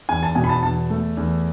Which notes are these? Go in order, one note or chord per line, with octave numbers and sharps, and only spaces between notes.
E2 G#5
A5
B2 G#5
B5
A5
E2 A5
A3
E2